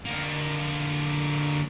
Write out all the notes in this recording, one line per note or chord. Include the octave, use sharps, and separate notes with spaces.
D3 A#3